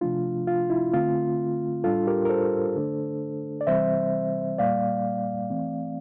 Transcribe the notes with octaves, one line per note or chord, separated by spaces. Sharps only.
C3 F3 A3 D4 F4
F4
E4
D3 A3 C4 F4
A2 G3 D4 F4 A4
G4 A#4
A#4
A4 C5
D3 A3 D4
D5
C3 E3 G3 C4 C5 E5
A#2 G3 A#3 D5 F5
E3 A3 C4